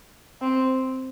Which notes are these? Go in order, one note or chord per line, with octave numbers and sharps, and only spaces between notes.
C4